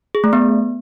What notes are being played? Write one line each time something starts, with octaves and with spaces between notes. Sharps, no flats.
G#4
A3
B3